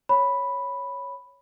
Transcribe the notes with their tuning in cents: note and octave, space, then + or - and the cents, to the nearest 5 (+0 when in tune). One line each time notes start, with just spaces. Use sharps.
C#5 +0 B5 +0